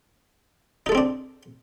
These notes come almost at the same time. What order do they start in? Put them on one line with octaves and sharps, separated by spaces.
D#4 A4 G#3 C4 D4